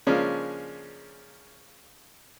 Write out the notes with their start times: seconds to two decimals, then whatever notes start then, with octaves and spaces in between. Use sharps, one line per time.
0.07 C#3 F3 G#3 A#3 C#4 D4